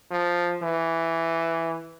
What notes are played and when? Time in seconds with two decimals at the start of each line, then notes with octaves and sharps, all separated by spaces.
0.11 F3
0.62 E3